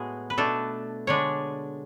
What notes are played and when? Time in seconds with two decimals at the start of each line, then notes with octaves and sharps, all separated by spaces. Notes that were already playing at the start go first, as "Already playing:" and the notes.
Already playing: A2 G#3 B3 F#4 G#4
0.30 B4
0.38 B2 A3 D4 A4
1.07 D3 G#3 D4 C#5